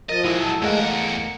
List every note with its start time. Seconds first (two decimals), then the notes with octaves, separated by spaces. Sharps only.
0.09 F3 A#4 D#5 A6
0.25 F#3 G#3 E4
0.40 A4
0.62 E2 G#3 A3 A#4 F5 F#5
0.81 C#7